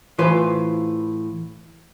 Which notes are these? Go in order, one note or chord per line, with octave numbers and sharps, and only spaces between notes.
A2 E3 F4 B4 C5